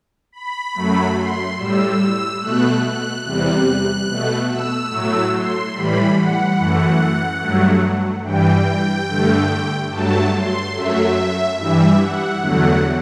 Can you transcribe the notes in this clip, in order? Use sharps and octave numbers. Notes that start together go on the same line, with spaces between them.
B5
F#2 F#3 A3
C6
A2 G3 E6
B2 A3 F#6
F#6
E2 C3 G3 F#6
B2 A3
E6
A2 F#3 A3
C6
A2 E3 G3 B5
F#5
F#2 E3 A3
G2 F#3 A3
G2 E3 G3 G5
G2 D3 A3
G2 F#3 A3 A5
C6
F#2 F#3 A3 E5
G2 E3 G3 E5
F#5
E2 D3 F#3 A3 F#5